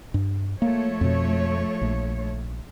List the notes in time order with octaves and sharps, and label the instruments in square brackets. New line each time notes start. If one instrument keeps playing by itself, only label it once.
[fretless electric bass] G2
[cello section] F3 A3 C#5 [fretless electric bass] A#3
[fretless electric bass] F2 B2
A#1